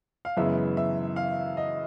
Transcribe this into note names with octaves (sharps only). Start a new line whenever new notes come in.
F5
F#2 C#3 E3 G#3 B3 E5
E5
F5
D#5